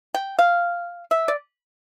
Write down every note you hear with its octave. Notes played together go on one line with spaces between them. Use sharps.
G5
F5
E5
D5